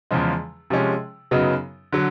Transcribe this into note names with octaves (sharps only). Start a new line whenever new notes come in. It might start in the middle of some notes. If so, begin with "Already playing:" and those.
E2 C#3 F3 G#3
C3 F3 G#3 C#4
F#2 C#3 F#3 B3 D#4
D3 F#3